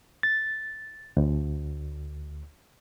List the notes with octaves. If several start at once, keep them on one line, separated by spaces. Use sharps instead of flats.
A6
D2